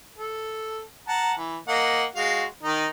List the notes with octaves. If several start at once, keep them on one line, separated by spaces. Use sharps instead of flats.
A4
F#5 A5 A#5
E3
A#3 D#5 F#5
G#3 F#4 F5
D#3 D#4